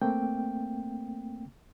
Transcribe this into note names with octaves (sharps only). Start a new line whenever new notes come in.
A3 A#3 C4 G5